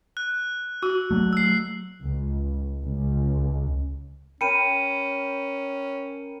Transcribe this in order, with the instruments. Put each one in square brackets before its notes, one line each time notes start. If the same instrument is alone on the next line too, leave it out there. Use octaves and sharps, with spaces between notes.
[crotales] F#6
[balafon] F#4 [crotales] E6
[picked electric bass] F#3 A3
[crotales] E6 C7
[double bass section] C#2
C#2
[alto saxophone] C#4 [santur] A#4 G5 B5 [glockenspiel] C#7 D#7